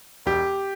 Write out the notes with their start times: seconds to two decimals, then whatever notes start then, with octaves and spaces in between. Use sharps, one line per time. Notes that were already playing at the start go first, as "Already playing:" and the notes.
0.26 E1 G4